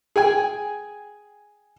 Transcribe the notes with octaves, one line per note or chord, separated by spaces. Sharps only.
G#4 G5 G#5